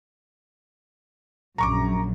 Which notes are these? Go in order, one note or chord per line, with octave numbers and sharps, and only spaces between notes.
A#1 F#2 A#5 C#6 D6